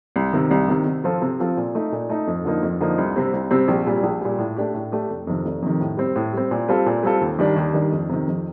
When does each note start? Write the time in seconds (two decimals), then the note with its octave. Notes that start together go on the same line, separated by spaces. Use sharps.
0.16 C2
0.33 C3 D#3
0.51 C2
0.68 C3 D#3
0.86 C3
1.04 F3 C4 F4 A4
1.22 C3
1.39 F3 C4 F4 A4
1.57 A#2
1.75 A3 D#4
1.92 A#2
2.09 A3 D#4
2.27 F2
2.45 D3 F3 A#3 D#4
2.63 F2
2.80 D3 F3 A#3 D#4
2.98 C2
3.16 C3 G3 C4
3.33 C2
3.51 C3 G3 C4
3.68 A#1
3.86 A#2 G3
4.03 A#1
4.21 A#2 G3
4.39 A2
4.57 A3 D4 G4
4.74 A2
4.92 A3 D4 G4
5.10 F1
5.27 F2 C3 D#3
5.45 F1
5.62 F2 C3 D#3
5.80 A2
5.97 G3 C4
6.16 A2
6.33 G3 C4
6.51 A#2
6.68 G3 C4 F4 A4
6.86 A#2
7.03 G3 C4 F4 A4
7.21 D#2
7.39 D#3 G3 D4
7.56 D#2
7.74 D#3 G3 D4
7.92 F2
8.09 C3 D#3
8.27 F2